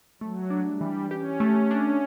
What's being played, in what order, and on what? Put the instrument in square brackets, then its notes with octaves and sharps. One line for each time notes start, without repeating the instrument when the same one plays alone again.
[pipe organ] F#3 [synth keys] A3
[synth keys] D4
[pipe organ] G3
[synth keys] E3
[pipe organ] C#4 [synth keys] G4
[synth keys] A3
D4